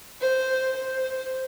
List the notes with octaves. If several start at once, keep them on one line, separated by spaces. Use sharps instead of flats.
C5
C5